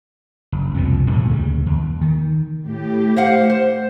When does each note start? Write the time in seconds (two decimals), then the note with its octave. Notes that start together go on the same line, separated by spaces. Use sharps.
0.52 F#1
0.75 C2 F2 B2 D3
1.11 G2 A#2 C#3 A3
1.29 D2 C#3 G3
1.66 D#2
2.01 D#3
2.66 A2 G4
3.16 C5 F5 F#5
3.50 C5